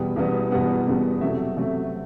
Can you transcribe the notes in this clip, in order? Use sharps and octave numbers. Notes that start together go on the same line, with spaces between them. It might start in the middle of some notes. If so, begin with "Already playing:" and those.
Already playing: E2 B2 G3 B3 G5
E2 B2 G3 B3
E2 B2 G3 B3 F#5
E2 B2 G3 B3
C3 F#3 A3 E5
C3 F#3 A3